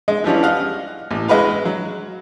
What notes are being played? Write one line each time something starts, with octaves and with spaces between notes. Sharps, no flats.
G#3
E3 F3 G3 C#4
D#5 F5 F#5
A1
G#3 F#4 B4 F5
F#3